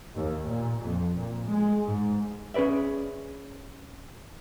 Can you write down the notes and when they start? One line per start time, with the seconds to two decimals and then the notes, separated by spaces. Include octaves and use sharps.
0.14 D#2
0.47 A#2
0.79 F2
1.16 A#2
1.46 G#3
1.86 G#2
2.54 C#4 G#4 B4 D5 E5